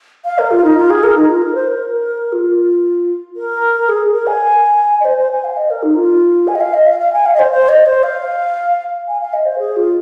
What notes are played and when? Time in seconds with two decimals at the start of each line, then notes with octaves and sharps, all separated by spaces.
0.25 F5
0.39 A#4
0.51 F4
0.64 D#4
0.77 F4
0.90 G#4
1.04 A#4
1.16 D#4
1.29 F4
1.42 A#4
1.55 C5
1.68 A#4
2.33 F4
3.36 A#4
3.89 G#4
4.14 A#4
4.27 G#5
5.01 D#5
5.05 C5
5.18 C5
5.31 G#5
5.44 F5
5.57 D#5
5.70 A#4
5.83 D#4
5.96 F4
6.48 G#5
6.55 D#5
6.61 F5
6.74 D#5
6.87 F5
7.00 F5
7.13 G#5
7.26 F5
7.34 D#5
7.39 C5
7.51 C5
7.69 D#5
7.86 C5
8.03 F5
9.08 G#5
9.21 F5
9.33 D#5
9.46 C5
9.59 G#4
9.77 F4